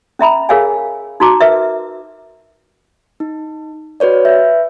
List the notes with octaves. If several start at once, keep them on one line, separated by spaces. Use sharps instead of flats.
C#4 E5 A#5 B5
G#4 A#4 C#5 F5 F#5 G#5
D#4 F#4 A#5 D6
A#4 B4 E5
D#4
F#4 B4 C#5 D5
B4 E5 G6